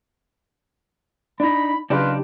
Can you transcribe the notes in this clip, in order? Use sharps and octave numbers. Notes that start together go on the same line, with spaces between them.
D4 D#4 B5
C#3 F#3 D4 D#4 F4 G4 B4